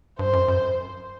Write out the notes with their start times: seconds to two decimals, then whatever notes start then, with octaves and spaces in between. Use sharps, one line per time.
0.19 G2 C5
0.33 F#2
0.48 F#2